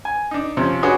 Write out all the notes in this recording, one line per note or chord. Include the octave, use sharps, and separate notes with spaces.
G#5
D4 D#4
C3 F3 C#4
D4 F#4 G#4 B4 C#5 D#5